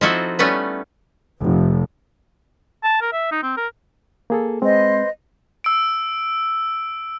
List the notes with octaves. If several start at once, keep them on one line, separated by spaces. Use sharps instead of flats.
F3 C4 D#4 E4 F#4 A4
G3 A3 B3 C#4 B4
F1
A5
A#4
E5
D#4
C4
A#4
A#3 G#4 A4
G#3 C4 B4 C5 D#5
E6 D7